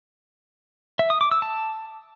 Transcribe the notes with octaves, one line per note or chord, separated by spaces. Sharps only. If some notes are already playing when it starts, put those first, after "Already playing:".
E5
D#6
D6
E6
A5